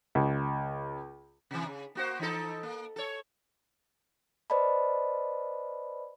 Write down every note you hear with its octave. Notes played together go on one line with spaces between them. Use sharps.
C#2
C3 E3
C#3
A#3 F#4 C5
E3 D#4 A4
A#3
A4 C#5
B4 C5 D5 D#5 A5 B5